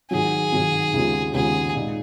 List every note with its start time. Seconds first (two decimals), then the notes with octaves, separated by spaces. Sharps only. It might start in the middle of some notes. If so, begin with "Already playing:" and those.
0.11 G#2 D#3 F#3 G#4
0.52 G#2 D#3 F#3
0.93 D#2 C#3 G#3 B3 F4
1.34 D#2 C#3 G#3 B3 F4 G#4
1.75 A#2 G#3 D#4